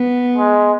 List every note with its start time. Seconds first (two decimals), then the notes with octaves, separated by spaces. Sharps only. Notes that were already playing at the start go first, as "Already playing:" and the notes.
Already playing: B3
0.36 G#3